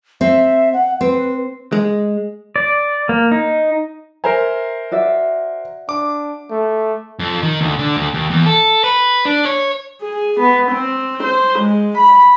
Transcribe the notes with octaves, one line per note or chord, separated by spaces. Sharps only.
C4 E5
F#5
C4 B4
G#3
D5
A#3
D#4
A#4 C5 E5 G#5 A#5
F#4 D5 E5
D4 D6
A3
F2
D#3
D2
D3
D2
D#2
E2
A4
B4
D4
C#5
G#4
B3
C4
C5
G#3
B5